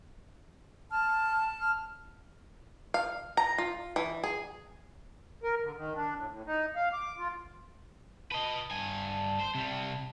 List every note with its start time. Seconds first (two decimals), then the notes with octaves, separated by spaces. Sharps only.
0.91 A5 F6
1.60 F6
2.94 F5
3.37 A#5
3.58 F4
3.96 E3
4.24 G#4
5.43 A#4
5.62 D3
5.77 D#3
5.95 D4
6.16 A2
6.29 A2
6.47 D#4
6.76 F5
6.93 D6
7.18 F4
8.32 B4 D#5 A5
8.71 G2 G#5
9.40 C5
9.55 C3 G3